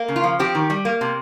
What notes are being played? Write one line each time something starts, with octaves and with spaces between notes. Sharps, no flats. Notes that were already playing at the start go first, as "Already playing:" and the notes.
Already playing: A#3
C#3
F4
F3
C4 G4
D#3
G3
A#3
C3